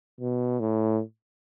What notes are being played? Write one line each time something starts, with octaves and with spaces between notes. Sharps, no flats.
B2
A2